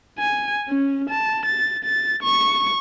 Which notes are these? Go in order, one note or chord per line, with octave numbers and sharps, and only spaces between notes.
G#5
C#4
A5
A6
A6
C#6